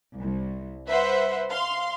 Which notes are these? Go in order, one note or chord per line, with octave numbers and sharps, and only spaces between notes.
C2
B4 C5 E5 F#5
F5 C6